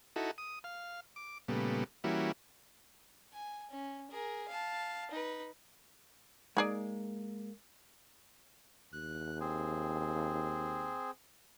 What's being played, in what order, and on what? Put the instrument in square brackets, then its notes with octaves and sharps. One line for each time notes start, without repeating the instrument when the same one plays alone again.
[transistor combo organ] D#4 E4 F#4 A4
D#6
F5
D6
A#2 C#3 G3 A3 B3
E3 G3 A#3 C#4 E4 F#4
[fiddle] G#5
C#4
G#4 A#4
F5 A5
D#4 B4
[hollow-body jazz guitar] G#3 A#3 [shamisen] D#4 G#4 D5
[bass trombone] D#2 [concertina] F#6
[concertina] C4 G#4